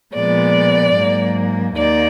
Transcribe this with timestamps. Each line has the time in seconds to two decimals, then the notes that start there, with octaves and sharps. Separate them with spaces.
0.14 A#2 F3 G#3 B3 D5
0.95 G#2 F#3 A#3
1.77 D#2 D#3 A#3 D5